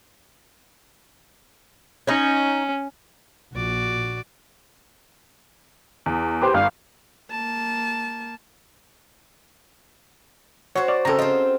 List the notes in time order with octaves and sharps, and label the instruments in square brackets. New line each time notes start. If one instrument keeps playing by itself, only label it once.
[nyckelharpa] C#4 [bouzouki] D#4 C#5
[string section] A#1 [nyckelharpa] F#4 D5
[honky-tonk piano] E2
[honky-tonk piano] G4 B4 D6 [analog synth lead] C5
[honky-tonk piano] G1 [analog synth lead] F5
[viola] A#3 A5
[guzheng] F#4 C5 [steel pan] C#5
[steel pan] D5
[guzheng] C#3 C4 [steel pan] A4 A#5
[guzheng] F4 C5 [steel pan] D#5